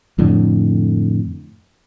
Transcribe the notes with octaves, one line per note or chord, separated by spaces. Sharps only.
F2 A2 D3